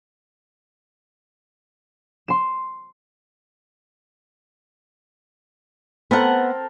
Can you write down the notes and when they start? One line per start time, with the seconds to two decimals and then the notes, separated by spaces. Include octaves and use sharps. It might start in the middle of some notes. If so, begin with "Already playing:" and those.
2.28 C6 E7
6.11 B3 C4 A4 A#4 F#5